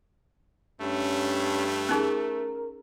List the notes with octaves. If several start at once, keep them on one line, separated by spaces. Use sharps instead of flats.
G2 A3 C#4
C#4 D#4 G#4 A#4